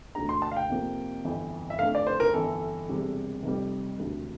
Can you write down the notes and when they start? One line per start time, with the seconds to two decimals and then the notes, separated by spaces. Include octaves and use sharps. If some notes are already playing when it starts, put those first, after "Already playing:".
0.15 E1 D2 D3 A3 A#5
0.29 C6
0.42 A5
0.52 F5
0.56 G5
0.70 F2 C3 F3 A#3
1.25 G1 F2 E3
1.70 E5
1.79 F2 D3 A3 F5
1.95 D5
2.07 C5
2.20 A#4
2.34 G1 F2 E3 A4
2.89 E1 E2 C3 G3
3.43 F1 F2 C3 G3
3.98 E1 D2 C3